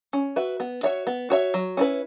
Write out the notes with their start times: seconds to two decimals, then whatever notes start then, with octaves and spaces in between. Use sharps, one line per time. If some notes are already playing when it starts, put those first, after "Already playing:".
0.13 C#4
0.36 F#4 B4 E5
0.60 B3
0.83 F#4 C#5 E5
1.07 B3
1.30 F#4 C#5 E5
1.54 F#3
1.77 C#4 E4 B4